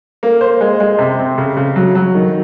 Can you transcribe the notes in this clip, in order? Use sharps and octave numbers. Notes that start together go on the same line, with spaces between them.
A#3
C5
G#3
G#3
C3
C4
C#3
C#3
F#3
F#3
D#3